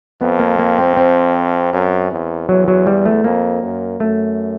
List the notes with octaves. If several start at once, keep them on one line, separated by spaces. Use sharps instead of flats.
F2 B3
A#3
A#3
C4
C4
F#2
E2
E2 F#3
F#3
G3
A3
F2 A#3
F#2
F#2 A3